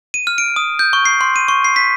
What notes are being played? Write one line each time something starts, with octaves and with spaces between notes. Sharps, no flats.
D#7
F6
D7
D#6
G6
C#6
C7
C6
D#7
C#6
C7
B6